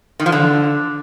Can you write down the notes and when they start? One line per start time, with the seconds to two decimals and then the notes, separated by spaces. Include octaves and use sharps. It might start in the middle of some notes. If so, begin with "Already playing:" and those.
0.20 D#3
0.26 F3
0.32 D3